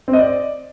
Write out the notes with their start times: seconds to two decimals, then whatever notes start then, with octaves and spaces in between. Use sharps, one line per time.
0.08 C4
0.13 D#5
0.19 D5